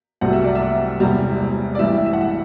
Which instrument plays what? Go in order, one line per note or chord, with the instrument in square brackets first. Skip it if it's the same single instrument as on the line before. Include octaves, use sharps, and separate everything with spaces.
[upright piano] C2 C3 F#3 A3 F#5
E5
D5
E5
E1 E2 C3 G3
D5
A1 G2 E3 E5
E5
F#5
E5